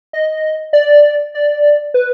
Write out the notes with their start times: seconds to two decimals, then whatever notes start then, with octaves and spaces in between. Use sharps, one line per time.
0.13 D#5
0.73 D5
1.34 D5
1.94 B4